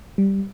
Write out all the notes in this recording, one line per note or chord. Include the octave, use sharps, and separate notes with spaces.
G3